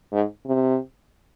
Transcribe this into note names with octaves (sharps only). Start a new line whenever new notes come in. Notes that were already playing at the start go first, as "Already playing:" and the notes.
G#2
C3